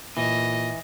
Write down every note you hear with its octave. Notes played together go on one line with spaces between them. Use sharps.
A#2 E3 D#5